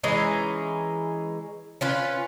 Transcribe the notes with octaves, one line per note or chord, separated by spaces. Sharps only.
E3 G#3 C#4 D#4
C#4 F4 B4